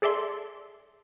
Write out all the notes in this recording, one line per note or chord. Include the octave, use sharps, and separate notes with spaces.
G#4 A4 D5 E5 C6